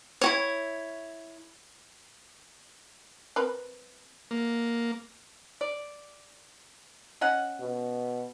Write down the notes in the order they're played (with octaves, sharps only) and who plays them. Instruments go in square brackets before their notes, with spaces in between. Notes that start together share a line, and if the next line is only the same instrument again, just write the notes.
[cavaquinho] E4 F#4 C#5
[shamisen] C4 A#4 B4
[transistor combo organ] A#3
[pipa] D5
C#4 D#5 F#5
[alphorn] B2